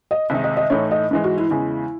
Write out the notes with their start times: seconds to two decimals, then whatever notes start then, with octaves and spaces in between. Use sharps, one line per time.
0.11 D#5
0.30 C2 C3 D#3 G#3 D#4
0.44 D#5
0.57 D#5
0.70 A2 E3 A3 D#4 C#5
0.91 D#5
1.11 G#2 E3 G#3
1.24 F#4
1.38 E4
1.50 E2 C#3 G#3 E4